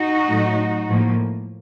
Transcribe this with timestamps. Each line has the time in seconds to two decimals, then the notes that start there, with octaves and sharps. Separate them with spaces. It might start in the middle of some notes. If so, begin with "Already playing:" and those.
Already playing: D#4 F#4
0.27 A2 F#3 A3
0.88 A2 F3 A#3